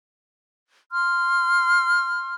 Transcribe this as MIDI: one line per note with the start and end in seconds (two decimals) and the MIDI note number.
0.92 2.35 84
0.92 2.35 89